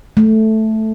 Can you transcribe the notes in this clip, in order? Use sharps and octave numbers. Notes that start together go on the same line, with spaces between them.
A3